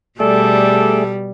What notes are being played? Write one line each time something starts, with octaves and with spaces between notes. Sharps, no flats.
B2 G3 A3 G#4 A4 D5